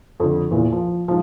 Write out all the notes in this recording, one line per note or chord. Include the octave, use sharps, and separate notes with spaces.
F2 D3
E2 A#2
F3
G#2 F3